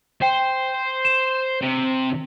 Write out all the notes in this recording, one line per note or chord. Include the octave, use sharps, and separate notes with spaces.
C5 G5
E7
C3